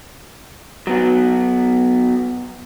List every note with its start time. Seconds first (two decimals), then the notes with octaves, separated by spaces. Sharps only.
0.87 F#3 B3 F#4